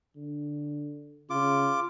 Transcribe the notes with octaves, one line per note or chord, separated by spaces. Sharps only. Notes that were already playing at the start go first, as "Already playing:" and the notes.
D3
C#3 F4 D6